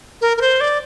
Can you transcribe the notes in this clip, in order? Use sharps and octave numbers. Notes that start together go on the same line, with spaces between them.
A#4
A#4
C5
D5